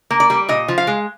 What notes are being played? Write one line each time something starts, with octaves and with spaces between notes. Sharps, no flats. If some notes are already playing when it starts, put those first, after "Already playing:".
A#3
D5
G3
A#2 D#5
F3
F5
G#3